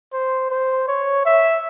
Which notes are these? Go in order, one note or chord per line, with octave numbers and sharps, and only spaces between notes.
C5
C5
C#5
E5